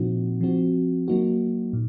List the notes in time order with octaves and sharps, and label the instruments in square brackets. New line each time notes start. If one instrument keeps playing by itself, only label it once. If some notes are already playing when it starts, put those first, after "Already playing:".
Already playing: [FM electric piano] A#2 F3 C4 D#4 F#4
F3 C4 F#4
F#3 A#3 D#4 F#4
A#2